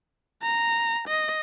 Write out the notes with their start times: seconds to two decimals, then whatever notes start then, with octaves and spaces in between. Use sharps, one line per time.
0.42 A#5
1.08 D#5